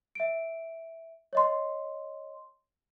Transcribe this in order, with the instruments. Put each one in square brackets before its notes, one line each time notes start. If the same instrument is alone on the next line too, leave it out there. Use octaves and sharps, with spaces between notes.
[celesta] E5 D7
C#5 D#5 C6